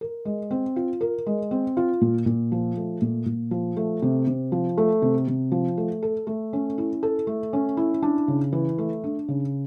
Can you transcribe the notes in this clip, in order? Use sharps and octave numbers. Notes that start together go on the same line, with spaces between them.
A#4
G#3
C4
F4
A#4
G#3
C4
F4
A#2
A#2
F3
A3
A#2
A#2
F3
A3
C3
C3
F3
A3
C3
C3
F3
A3
A4
A3
C#4
E4
A4
A3
C#4
E4
D4
C#3
E3
A3
D4
C#3